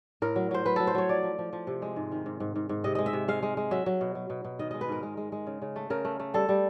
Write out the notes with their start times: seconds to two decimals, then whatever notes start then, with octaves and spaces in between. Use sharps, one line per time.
0.22 A2 A#4
0.36 F#3
0.51 F#3 C5
0.65 F#3 B4
0.76 F#3 A4
0.87 C5
0.95 F#3 C#5
1.09 F3 D5
1.23 F3
1.38 F3
1.53 F3
1.67 C3
1.82 G#3
1.96 G#2
2.12 D#3
2.26 G#2
2.40 G#2
2.56 G#2
2.69 G#2
2.84 C3 D#5
2.95 G#3 D#5
3.06 E5
3.13 C3
3.28 G#3 F5
3.43 G#3
3.57 G#3
3.71 F#3 E5
3.86 F#3
4.01 B2
4.15 F#3
4.30 B2
4.44 B2
4.59 D#3 D#5
4.71 G#3 D#5
4.81 B4
4.89 G#2 A#4
5.03 G#3
5.17 G#3
5.32 G#3
5.47 C#3
5.62 C#3
5.76 A3
5.90 C#3 A#4
6.05 A3
6.20 A3
6.34 G3 A4
6.49 G3